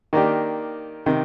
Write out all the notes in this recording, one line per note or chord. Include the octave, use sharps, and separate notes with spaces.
D#3 A#3 D4 G4
C3 D#3